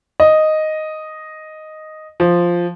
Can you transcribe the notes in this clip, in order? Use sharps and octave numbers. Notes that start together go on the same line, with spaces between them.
D#5
F3